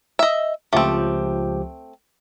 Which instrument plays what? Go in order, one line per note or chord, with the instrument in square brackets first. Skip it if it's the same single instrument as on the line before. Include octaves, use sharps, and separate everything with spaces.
[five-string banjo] D#5 E5
[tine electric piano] C#2 F3 G4 [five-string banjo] A3 C4